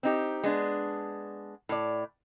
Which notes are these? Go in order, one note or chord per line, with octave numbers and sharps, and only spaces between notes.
C4 D#4 G4
G#3 B3 D4
A2 D5